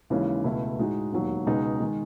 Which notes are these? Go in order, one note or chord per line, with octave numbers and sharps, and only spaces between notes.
D#2 C#3 E3 G#3 C#4
C#2 B2 A3 E4
A2 G#3 D#4 F#4
E1 D#2 D#3 F#3
C#2 B2 G#3 D#4
D#3 G#3